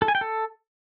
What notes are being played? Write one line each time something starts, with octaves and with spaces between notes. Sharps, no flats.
A4
G#5
G5
A4